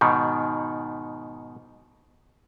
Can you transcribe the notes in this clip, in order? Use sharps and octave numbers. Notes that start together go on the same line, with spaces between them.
G#2 B2 D#3